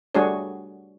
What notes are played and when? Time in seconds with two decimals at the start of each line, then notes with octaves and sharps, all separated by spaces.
0.15 G3 A3 D4 F#4 G#4 C#5